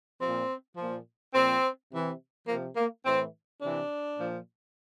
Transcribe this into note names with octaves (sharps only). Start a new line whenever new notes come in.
A#2 F3 C4
A#2 F3
A#2 F3 C4
C3 E3
C3 F3 A#3
A#3
A2 E3 C4
C3 E3 D4
A#2 F3